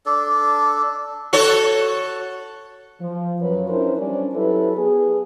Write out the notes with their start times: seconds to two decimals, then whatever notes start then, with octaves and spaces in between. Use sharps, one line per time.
0.06 D4 A4 D5
1.33 F#4 A4 C#5
3.00 F3
3.41 F#2 F#3 F4 B4 C#5
3.69 C#4 D4 E4 A#4 C5
3.98 G3 C#4 D4
4.34 F#3 E4 G4 A4 B4
4.77 B3 G#4